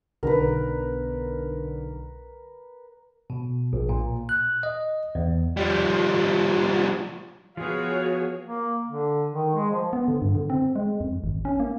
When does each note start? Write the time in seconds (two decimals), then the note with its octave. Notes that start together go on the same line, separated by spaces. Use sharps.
0.23 B1 D3 A#4 B4
3.30 B2
3.73 A#1
3.89 A#2
4.29 F#6
4.63 D#5
5.15 E2
5.57 F3 G3
7.57 F3 B3 F#4 G#4 C#5 F5
8.44 A#3
8.86 D3
9.32 D#3
9.55 G#3
9.71 F3
9.93 B3
10.08 D3
10.22 G2
10.35 D3
10.50 C4
10.76 G#3
11.00 F2
11.24 G#1
11.45 C#4
11.60 A#3